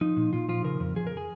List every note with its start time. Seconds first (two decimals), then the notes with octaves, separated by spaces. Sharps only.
0.01 F3 D#4
0.17 A#2
0.33 A#2 F4
0.49 F3 F4
0.64 C#3 A#4
0.80 F2
0.96 F3 G#4
1.07 A#4
1.17 G#4